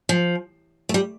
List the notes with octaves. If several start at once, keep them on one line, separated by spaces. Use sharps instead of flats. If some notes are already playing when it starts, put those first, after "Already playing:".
F3
A3
G3